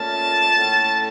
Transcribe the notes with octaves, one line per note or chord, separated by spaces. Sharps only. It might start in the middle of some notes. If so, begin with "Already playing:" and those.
Already playing: A#2 A3 C#4 A5
A2 A3 C#4